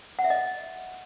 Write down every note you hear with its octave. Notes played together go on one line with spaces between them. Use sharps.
F#5
E5
D#5